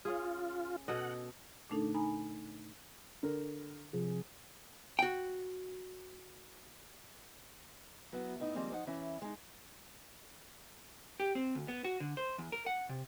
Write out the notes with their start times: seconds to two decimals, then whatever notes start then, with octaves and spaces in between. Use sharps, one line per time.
0.05 C#4 F4 G#4
0.88 B2 A4 D#5 F#5
1.70 A#2 D3 A3 D4 D#4 A4
1.94 D#4 G#5 A#5 B5
3.23 D3 A#4
3.93 C3 F3 G#4
4.99 F#4 G5
8.12 F#3 B3 E4 F#4
8.40 A2 B3 D#4 E4
8.55 D#3 F3 G3 G#3 A#3 C4
8.72 F3 D#4 F#5
8.87 E3 C#4 E4
9.22 G#3 D#4
11.20 G4
11.35 C4
11.55 D2
11.68 B3
11.84 F#4
12.00 D3
12.17 C5
12.38 E2
12.52 A#4
12.66 F#5
12.89 C3